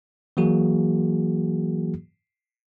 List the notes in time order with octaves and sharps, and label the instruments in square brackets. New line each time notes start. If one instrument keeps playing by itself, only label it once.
[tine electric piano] E3 F#3 A#3 F#4 G#4